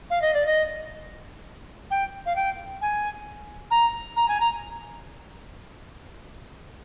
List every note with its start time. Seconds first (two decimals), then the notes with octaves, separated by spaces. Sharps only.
0.10 F5
0.22 D#5
0.34 D5
0.46 D#5
1.91 G5
2.26 F5
2.36 G5
2.82 G#5
3.71 A#5
4.16 A#5
4.28 G#5
4.40 A#5